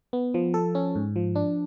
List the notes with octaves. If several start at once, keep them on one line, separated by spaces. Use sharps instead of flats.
B3
F3
A4
C#4
G#2
F3
D4